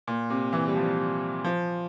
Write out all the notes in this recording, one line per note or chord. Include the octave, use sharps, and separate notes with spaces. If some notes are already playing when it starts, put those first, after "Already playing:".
A#2
C3
E3
G3
F3
F3